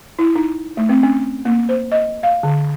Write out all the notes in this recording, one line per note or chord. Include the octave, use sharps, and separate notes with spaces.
E4
D#4
A3
C4
C#4
A#3
C5
D#5
F5
D3